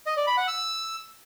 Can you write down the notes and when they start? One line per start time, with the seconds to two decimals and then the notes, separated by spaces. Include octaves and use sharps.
0.06 D#5
0.17 D5
0.27 B5
0.37 F#5
0.48 E6